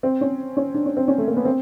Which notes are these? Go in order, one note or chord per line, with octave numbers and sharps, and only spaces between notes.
C4
C#4
C#4
D4
C#4
C4
C#4
A3
A#3
B3
C4